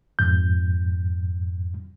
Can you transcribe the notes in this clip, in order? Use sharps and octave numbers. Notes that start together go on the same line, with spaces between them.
F2 G#2 G6